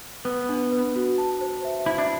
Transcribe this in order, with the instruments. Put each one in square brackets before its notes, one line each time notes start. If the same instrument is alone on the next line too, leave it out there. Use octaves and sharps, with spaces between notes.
[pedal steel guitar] B3 [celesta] B4
[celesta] D4
B4
F#4
A5
C5
E5
[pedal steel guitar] E4 [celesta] E5
[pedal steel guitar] D4